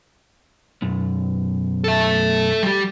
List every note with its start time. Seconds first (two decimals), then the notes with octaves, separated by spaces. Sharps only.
0.82 B1 F#2
1.84 A4 E5
2.63 G3 G4